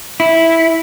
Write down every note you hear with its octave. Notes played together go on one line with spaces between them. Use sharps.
E4